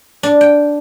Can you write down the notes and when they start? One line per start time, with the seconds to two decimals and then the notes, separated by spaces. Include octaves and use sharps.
0.23 D4
0.41 G5